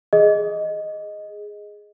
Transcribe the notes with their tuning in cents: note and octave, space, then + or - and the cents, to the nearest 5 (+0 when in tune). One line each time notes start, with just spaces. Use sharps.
G#4 +0 D#5 +0